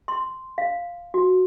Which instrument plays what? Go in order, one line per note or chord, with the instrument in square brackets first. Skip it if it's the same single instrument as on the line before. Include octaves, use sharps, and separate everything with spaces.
[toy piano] C6
F5
F#4